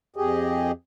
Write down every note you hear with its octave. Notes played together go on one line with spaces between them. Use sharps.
F2 G4 G#4 D#5